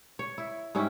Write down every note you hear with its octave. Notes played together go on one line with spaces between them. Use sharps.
C#5
E4
G#2 G3 C#4 E4